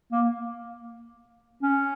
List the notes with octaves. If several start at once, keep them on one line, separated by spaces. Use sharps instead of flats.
A#3
C#4